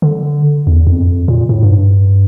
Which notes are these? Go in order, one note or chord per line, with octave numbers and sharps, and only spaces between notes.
D3
E2
F2
A#2
A2
G2